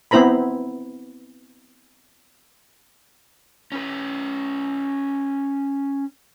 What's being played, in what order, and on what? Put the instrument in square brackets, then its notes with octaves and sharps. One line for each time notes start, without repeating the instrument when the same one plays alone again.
[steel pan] B3 C4 E4 C5 A#5 B5
[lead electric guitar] C#4 B4